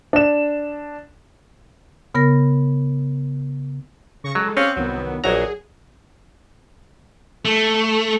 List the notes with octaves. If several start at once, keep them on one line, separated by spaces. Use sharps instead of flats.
D4 E7
C#3 B3 A#4 A#6
C#3 C#6 A#6
F#3 G#3 A4
C4 C#4 G4 F5 F#6
C2 D#3 F#3 B3
A#1 F#3 G#4 A#5
A3